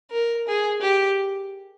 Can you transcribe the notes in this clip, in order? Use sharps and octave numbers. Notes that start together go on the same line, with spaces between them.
A#4
G#4
G4